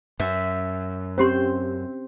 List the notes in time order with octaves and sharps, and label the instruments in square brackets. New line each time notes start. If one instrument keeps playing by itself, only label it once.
[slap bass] F#2 [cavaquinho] E5
[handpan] C4 C5 [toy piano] C#4 G4 C6